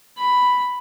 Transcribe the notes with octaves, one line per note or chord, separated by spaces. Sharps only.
B5